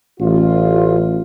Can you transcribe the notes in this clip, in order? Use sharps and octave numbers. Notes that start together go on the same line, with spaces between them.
A1 F4